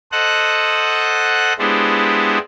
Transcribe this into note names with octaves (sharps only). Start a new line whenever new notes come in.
A4 C5 D#5 F#5 F#6
G#3 B3 D4 E4 G4 C5